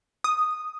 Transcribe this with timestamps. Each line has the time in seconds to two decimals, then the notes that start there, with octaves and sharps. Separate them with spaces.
0.24 D#6